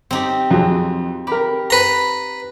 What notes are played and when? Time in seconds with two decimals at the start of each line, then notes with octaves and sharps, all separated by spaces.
0.11 C4 D#4 G4
0.50 F2 F#3 G#4
1.27 G4 A#4 B5
1.70 B4 A#5